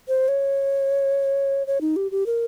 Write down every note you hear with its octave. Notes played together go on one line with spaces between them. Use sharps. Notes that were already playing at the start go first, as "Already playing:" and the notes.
C5
C#5
C#5
D#4
G4
G4
A#4